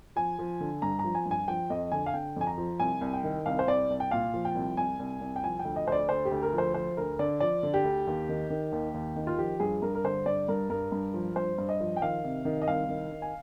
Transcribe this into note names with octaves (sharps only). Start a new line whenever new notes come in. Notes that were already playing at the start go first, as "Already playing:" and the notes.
F3 G#5
F3
D3
G2 A#5
A#5
F3
G#5
G2
G#5
F3 G5
F2 D#5
D3 G#5
F5
D3 G5
F2 G#5
A#5
F3
C2 G#5
C2
G5
D#3
C2 F5
C5
C2 D5
C2
G5
A#2 F5
F3
G5
C2
C2 G#5
C2
C2
G5
F3 G#5
G5
D2
D#5
D2 C5
D5
D2 C5
G4
D2
A#4
F3
C5
F3 C5
D2 A#4
D3 D5
F3 D5
D3
G4
D2
D#2
D#3
D#3
D#2
D#2
D#3
F4
F3 G4
G2 G#4
G2 A#4
A#4
D3 C5
G2 D5
G2 A#4
G2 A#4
G2
F3
G2 C5
G2
D#5
F3
G5
D#3 F5
C3
D#3
D#5
C2 F5
D#3
D#3
G#5